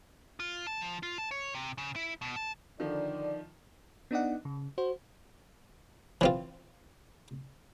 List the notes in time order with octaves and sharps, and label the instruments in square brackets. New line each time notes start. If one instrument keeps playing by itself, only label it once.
[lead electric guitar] F4
A5
F3
F4
A5
C#5
C3
C#3
E4
B2
A5
[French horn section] D3 D5 [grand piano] D#3 F3
[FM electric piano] B3 D4 D#4 D5 D#5 F#5
C#3
F#4 C5
[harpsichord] E3 C4 F4